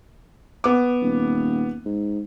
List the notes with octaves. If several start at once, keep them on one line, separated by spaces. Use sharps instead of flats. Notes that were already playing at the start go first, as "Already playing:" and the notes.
B3 D6
D#1
G#2